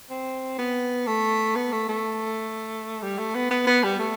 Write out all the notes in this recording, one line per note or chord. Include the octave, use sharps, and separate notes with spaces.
C4
B3
A3
B3
A3
A3
G3
A3
B3
B3
B3
G3
A3